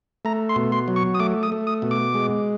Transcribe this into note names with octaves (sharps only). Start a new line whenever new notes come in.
A3 A#5
C6
B2
C6
F#3
C#6
D#6
A3 D6
D#6
A3
D#6
B2
D6
G#3